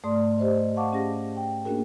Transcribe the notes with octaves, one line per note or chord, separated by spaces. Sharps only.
G#2 A3 D5 C6 D#6
G4 C5 D#5
F5 F#5 A5 C#6 D6
C#4 G4 G#4 A5 A#6
G5
A#3 C#4 D4 F#4 G#4 A#4